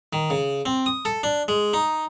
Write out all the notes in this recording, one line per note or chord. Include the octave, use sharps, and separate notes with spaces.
D#3
C#3
C4
D#6
A4
D4
G#3
D#4